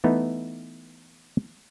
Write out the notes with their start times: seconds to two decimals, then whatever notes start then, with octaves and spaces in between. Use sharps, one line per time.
0.04 E3 A3 B3 D#4